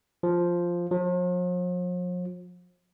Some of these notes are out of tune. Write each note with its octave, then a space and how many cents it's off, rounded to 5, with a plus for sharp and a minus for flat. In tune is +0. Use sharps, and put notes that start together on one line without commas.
F3 +0
F3 +45